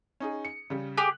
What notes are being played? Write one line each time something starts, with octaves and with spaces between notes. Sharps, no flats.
C#4 D#4 G#4
C#7
C#3 G3
G4 G#4 F#6